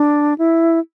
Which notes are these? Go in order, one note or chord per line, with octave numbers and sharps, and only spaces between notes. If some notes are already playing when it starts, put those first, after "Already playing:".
Already playing: D4
E4